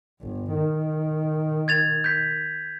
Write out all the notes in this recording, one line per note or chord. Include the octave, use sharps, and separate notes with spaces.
G1
D#3
G#6 A6 F7
G6 B6